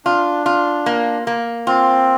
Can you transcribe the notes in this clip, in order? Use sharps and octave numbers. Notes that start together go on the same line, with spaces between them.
D4 F4
F4
A#3
A#3
C4 F4